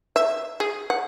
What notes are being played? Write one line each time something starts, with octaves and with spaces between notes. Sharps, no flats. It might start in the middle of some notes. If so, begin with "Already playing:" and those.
E5
G#4
F#5